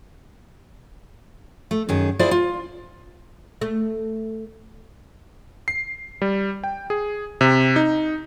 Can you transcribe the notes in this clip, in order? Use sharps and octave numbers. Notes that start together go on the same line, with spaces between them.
A3
F#2 D#3 G#4
E4 F4 G#4 C5 D5
F4
A3
C7
G3
G5
G#4
C3
D#4